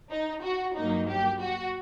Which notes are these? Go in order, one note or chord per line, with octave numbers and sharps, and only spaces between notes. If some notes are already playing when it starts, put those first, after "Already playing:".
D#4
F#4
G2 F#3 A#3 D#4
G4
F#4